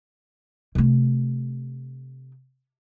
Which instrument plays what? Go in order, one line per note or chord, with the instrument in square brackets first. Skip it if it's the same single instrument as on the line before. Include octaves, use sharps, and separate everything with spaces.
[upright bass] C3 A3